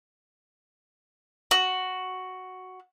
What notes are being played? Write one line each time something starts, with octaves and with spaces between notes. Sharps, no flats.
F#4